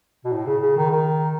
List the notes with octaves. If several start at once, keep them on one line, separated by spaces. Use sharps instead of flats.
B2
A2
C#3
C#3
D#3
D#3